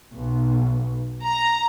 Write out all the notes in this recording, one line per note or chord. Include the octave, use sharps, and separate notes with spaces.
B1
A#5